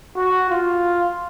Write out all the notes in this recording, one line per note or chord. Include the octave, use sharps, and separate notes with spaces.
F#4
F4